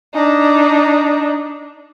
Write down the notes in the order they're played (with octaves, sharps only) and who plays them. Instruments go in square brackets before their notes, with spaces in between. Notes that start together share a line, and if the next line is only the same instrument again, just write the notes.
[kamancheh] D4 D#4